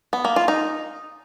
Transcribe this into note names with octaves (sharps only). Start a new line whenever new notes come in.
B3
A#3
F4
D#4